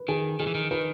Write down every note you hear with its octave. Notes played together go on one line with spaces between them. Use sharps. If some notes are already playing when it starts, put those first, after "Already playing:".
Already playing: B4
D#3 G#4
D#3 G#4
E3
D#3
D#3 B4